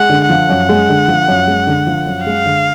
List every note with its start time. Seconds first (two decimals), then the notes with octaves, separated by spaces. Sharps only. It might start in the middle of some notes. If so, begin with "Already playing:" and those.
Already playing: G#3 F#5
0.09 D3
0.29 F3 F#5
0.49 F#2
0.69 G#3
0.89 D3
1.08 F3
1.28 F#2
1.47 G#3
1.67 D3
1.87 F3
2.06 F#2
2.26 G#3 F5
2.45 D3